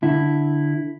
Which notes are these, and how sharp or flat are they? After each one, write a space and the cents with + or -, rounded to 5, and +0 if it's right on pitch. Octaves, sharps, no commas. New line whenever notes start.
D3 +0 E4 +0